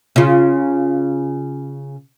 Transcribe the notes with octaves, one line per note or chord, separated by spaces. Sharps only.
C#3 F4